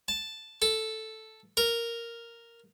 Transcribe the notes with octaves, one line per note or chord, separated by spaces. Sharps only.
A5
A4
A#4